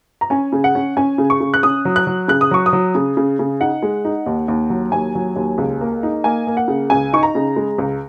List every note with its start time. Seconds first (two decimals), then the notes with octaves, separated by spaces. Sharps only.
0.21 A#5
0.30 C#4 G#5
0.52 C#3
0.64 F#5
0.75 C#4
0.97 C#4 G#5
1.18 C#3
1.30 C#6
1.40 C#3
1.54 F#6
1.63 C#4 D#6
1.85 F#3
1.96 F#6
2.07 F#3
2.28 C#3 F#6
2.41 D#6
2.51 F#3 C#6
2.66 D#6
2.73 F#3
2.95 C#3
3.17 C#3
3.39 C#3
3.60 D#4 F#5
3.82 G#3
4.05 D#4
4.26 D#2
4.48 D#2
4.70 F#3
4.92 D#2 G#5
5.15 F#3
5.36 D#2
5.58 C#2
5.81 A#3
6.03 D#4
6.24 A#3 G#5
6.47 A#3
6.57 F#5
6.68 C#3
6.90 C#2 G#5
7.13 D#4 C#6
7.23 A#5
7.35 C#3
7.56 G#3
7.78 C#2